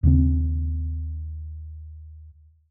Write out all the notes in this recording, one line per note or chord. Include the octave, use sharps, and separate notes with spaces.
D#2 C#3 C4